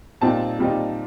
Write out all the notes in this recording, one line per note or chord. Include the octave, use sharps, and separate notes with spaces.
A#2 G3 C4 D#4 A5
A#2 G3 C4 D#4